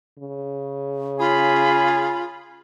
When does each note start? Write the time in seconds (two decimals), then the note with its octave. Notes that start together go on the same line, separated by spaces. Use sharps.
0.19 C#3
1.19 F4 G#4 B5